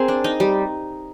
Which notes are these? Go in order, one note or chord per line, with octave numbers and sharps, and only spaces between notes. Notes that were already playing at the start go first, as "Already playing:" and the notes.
Already playing: C4 G#4 A#4
D4
D#4
G3